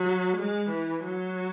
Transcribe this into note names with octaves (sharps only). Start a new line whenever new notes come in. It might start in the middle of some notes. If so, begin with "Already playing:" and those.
Already playing: F#3
G#3
E3
F#3